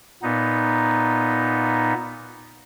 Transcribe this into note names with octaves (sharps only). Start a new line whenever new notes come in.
A#2 B3 D#4